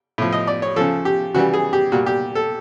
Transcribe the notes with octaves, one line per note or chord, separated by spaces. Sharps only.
A2 F3
D#5
D5
C#5
C#3 F3 A4
G4
C#3 E3 G3 F#4
G#4
G4
A#2 G3 F#4
G4
A4